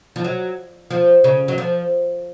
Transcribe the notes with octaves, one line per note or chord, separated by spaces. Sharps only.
F3
F#3
F3
C#3
F#3
F3